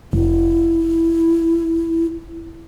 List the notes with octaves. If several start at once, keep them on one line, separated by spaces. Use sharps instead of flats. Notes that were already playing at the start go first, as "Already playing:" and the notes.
F1 E4